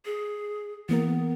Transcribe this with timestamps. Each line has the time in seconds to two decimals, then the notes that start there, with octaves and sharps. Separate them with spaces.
0.05 G#4
0.89 E3 A#3 B3 A#4